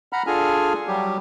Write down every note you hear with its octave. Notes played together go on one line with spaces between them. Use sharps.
F#5 A#5 B5 F6
D4 F4 G#4 A4 G#5 F6
F#3 G3 G4